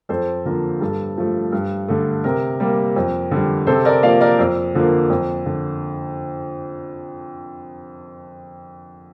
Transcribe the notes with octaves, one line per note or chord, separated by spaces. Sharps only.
F2 A4 C5
D3 F3 A#3 A#4
G2 A4
F3 A3
G2
D3 A3
C3 A#4
G3 A#3
F2
D3 G3
C3 A4 C5
A#4 D5
F3 A#3 D5 F5
A#4 D5
F2
D3 F3 A#3
F2
D3